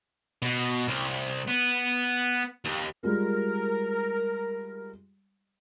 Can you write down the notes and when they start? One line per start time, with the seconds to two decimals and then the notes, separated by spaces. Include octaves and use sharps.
0.42 B2
0.88 C2
1.48 B3
2.65 D#2
3.03 G3 G#3 F4 A#4